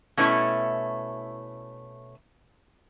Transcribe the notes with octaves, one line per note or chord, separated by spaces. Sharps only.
B2 A3 C#4 E4